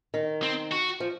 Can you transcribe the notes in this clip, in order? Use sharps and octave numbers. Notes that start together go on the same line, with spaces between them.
D#3
C4
F#4
F3